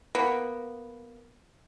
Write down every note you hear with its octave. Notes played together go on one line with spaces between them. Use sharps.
A#3 B3